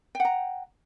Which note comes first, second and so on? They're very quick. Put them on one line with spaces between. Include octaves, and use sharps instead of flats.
G5 F#5 A#5